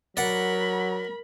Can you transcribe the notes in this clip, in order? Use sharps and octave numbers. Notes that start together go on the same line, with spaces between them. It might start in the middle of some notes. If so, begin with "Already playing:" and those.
F#3 A#4 D5 F#5 B5